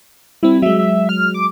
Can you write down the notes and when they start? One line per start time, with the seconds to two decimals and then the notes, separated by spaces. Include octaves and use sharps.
0.43 G3 C4 E4
0.62 F#3 G#3 E5
0.79 E5
1.09 F6
1.34 D6